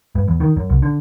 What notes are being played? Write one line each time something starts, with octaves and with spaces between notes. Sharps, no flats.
G2
E2
D#3
F#2
C2
D3